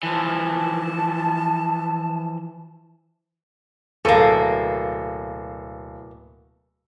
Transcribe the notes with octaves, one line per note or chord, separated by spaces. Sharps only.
E3 F3 A5
D1 B2 A#3 A4